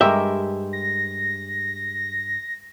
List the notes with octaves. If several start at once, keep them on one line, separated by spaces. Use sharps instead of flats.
G2 G#3 G4 A#4 E5
A#6